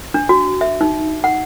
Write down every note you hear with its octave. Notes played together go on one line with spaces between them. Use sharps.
D4
F#4
E5
D#4
F#5